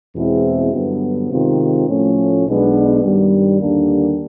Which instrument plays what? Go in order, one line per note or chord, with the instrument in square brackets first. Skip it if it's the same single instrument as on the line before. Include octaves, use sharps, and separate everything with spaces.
[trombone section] E2 B2 G#3 C4 E4
G2 D3 F#3 B3
C3 D#3 G#3 C4 F4
A2 F3 A3 C#4
B1 B2 G#3 B3 D4
G2 D#3 G3
D#2 D3 G3 A#3 D4